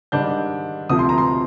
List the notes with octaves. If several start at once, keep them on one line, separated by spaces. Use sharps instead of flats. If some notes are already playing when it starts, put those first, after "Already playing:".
G#2 D#3 G3 D4 G6
D2 C3 F3 D#6
C6
A#5
C6